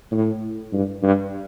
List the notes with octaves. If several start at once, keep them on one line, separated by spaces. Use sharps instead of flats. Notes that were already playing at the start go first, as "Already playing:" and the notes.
A2
G2
G2